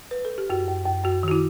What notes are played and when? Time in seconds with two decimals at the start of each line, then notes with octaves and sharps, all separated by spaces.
0.11 B4
0.25 A4
0.38 G4
0.50 F#2 F#4
0.68 F#2
0.86 F#2
1.04 F#2 F#4
1.23 D#3 F#4
1.31 E4